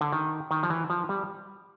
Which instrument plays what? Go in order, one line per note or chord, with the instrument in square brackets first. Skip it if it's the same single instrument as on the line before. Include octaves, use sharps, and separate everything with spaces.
[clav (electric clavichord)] D3
D#3
D#3
F3
E3
F3
G3